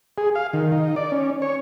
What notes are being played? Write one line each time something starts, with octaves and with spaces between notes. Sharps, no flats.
G#4
F5
D#3
D#4
D5
C#4
C#5